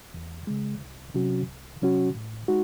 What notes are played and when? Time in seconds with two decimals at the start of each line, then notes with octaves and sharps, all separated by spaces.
0.14 E2
0.47 C#3 G#3
0.81 C2
1.14 C3 F#3 C#4 F#4
1.48 C2
1.82 C3 F#3 C#4 F#4
2.15 A2
2.48 G#3 D#4 F#4